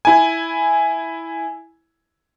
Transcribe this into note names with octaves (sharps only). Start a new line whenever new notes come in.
E4 G#5